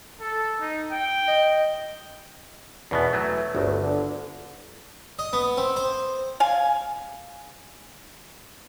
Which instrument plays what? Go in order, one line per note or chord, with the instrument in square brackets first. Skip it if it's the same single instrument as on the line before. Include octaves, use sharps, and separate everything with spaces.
[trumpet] A4
D#4
G5
[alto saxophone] D#5
[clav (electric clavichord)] E2 B2 B3 [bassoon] E3
[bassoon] E3 [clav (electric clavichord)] F#3 A3
[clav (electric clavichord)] G1 [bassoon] D2
[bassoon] D3
[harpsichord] D#5
B3
C4
C5
[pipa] F5 G#5